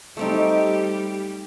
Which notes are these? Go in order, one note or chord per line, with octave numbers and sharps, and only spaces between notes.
G3 A3 C4 D#4 G4